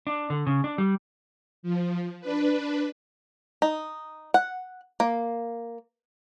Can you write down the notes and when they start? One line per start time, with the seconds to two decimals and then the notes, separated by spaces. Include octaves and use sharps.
0.07 D4
0.30 D3
0.47 C#3
0.64 D4
0.78 G3
1.63 F3
2.21 D4 B4
3.62 D#4
4.34 F#5
5.00 A#3